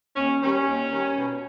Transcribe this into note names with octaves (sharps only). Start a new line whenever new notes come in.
D#2 C#4
D#3 G3 C#4
D#2
D#3 G3
B2